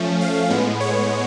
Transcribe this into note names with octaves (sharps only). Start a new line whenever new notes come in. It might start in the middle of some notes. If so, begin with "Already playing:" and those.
Already playing: F3 A3 C#4
F5
A2 G#3 B3
C#5